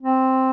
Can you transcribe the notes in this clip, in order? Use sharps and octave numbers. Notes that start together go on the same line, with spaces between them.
C4